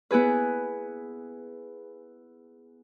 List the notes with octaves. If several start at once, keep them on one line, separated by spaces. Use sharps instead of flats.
B3 E4 G#4 B4